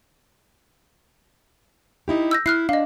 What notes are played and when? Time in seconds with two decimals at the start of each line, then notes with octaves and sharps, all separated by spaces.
2.08 D#4 E4 G4
2.31 E6 G6 A#6
2.46 E4 F6 F#6 C7
2.69 D4 D#5 F5